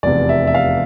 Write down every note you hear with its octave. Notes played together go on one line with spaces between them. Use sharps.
F1 E2 C3 D5
E5
E5
F5